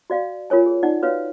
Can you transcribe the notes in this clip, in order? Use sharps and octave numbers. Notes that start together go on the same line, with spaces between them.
F#4 D5 F5
F4 A#4 C#5 G#5
G#4
D#4 D5 F#5
F#4 B4 C#5 F5